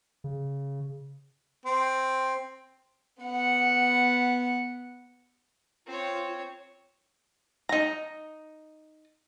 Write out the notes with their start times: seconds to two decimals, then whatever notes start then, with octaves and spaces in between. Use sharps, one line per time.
0.24 C#3
1.66 C4
3.23 B3 F#5
5.87 C4 F4 C#5
7.69 D#4 A#5